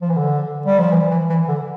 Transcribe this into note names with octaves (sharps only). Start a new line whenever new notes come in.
F3
E3
D3
G3
F3
E3
E3
E3
D3